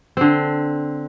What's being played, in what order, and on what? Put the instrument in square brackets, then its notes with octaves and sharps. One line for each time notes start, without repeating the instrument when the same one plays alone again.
[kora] D3 C4